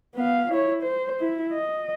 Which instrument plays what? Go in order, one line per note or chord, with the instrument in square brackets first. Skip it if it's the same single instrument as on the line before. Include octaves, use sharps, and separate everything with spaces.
[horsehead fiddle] B3 F5
E4 C#5
C5
E4
D#5